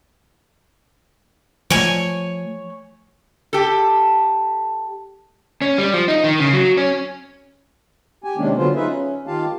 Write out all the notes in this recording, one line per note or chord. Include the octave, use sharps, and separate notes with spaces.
F3 A3 C#5 G#5
G4 A4
C#4
G3
F3
D#4
D#3
C#3
F#3
C#4
G4 G#5
C3 D#3 G#3 A#3 C#4 D4
D3 F#3 B3 F4 C5
D#4 F4 G#4 B4 E5
C#4
D#3 F4 G4 F5 A5